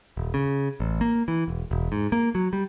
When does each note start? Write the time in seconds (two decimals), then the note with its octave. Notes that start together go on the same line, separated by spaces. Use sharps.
0.17 D#1
0.34 C#3
0.80 A1
1.01 A#3
1.28 E3
1.48 E1
1.71 E1
1.92 G#2
2.12 A#3
2.35 F#3
2.53 G3